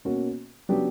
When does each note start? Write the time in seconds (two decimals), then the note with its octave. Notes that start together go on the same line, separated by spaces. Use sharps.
0.05 B2 A#3 C#4 F#4
0.69 C#3 F#3 B3 D4 G4